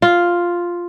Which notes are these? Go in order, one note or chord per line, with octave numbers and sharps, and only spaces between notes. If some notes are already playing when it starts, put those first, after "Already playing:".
F4